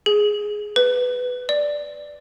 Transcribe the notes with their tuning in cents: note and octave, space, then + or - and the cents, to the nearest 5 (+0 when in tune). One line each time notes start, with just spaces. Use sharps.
G#4 +5
B4 +10
D5 +0